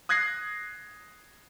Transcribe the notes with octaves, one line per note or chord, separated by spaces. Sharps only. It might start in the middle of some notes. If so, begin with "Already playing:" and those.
D#6 F#6 G#6 A#6 C7